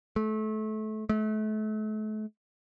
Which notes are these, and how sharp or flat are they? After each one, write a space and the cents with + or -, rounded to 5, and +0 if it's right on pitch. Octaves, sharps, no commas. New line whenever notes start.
A3 -25
A3 -35